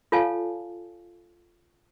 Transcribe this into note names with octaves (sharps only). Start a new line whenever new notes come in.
F4 A4 C#5 F5 G#5 A5